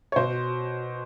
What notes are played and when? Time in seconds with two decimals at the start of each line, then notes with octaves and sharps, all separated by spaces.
0.12 C#5
0.16 B2 C5